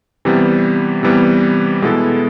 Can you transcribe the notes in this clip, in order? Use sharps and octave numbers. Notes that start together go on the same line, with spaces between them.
C3 E3 G3 B3
C3 E3 G3 B3
B2 G#3 B3 E4 A4